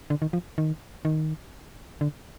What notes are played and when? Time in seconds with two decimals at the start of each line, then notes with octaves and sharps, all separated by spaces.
0.10 D3
0.22 D#3
0.33 F3
0.58 D#3
1.05 D#3
2.01 D3